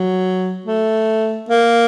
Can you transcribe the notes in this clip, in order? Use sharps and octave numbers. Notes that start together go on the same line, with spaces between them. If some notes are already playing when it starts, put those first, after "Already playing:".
Already playing: F#3
A3
A#3